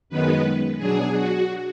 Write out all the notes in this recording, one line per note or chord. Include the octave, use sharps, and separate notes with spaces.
F#2 D#3 G#3 B3 B4
B2 F#3 D4 G#4
F#4